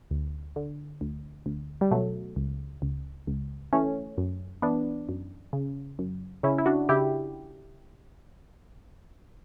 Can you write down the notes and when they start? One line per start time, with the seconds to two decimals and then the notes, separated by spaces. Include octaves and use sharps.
0.11 D2
0.56 D3
1.01 D2
1.46 D2
1.81 G3
1.91 B2 F#3 A3
2.36 C#2
2.82 C#2
3.27 C#2
3.73 E3 A3 C#4
4.18 F#2
4.62 E3 B3 D4
5.09 F#2
5.53 C#3
5.99 F#2
6.43 C#3 C#4 E4
6.58 E4
6.66 D4 F#4
6.89 C#3 E4 G4